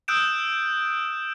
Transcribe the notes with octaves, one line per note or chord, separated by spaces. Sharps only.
D#6 E6 F#6 G6 D7 E7